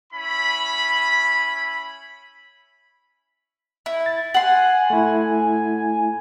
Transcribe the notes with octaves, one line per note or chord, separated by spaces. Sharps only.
C#4 E4 B5
E4
A6
F#5 G#5 C6
A3 E4